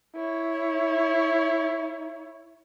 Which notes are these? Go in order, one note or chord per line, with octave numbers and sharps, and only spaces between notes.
E4 C#5